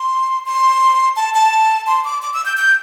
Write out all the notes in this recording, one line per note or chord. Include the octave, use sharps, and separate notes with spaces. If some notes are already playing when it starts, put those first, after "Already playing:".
Already playing: C6
C6
A5
A5
C6
D6
D6
E6
G6
G6